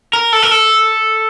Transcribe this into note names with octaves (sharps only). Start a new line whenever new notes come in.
A#4
A4
A#4
A4